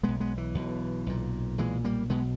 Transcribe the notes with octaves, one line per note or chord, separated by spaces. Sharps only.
B1 B2 G#3 B3
G#3 B3
E3
B1 B2
B1 A#2
B1 A#2 E3 G#3
G3 A#3
B1 B2 G#3 B3